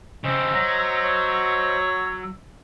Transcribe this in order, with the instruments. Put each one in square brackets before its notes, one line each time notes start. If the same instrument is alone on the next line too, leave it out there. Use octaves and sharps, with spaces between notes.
[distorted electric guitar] C#3 C4 [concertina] C5 D#5 [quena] E6
[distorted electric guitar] F#3 [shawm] A#5
[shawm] C#5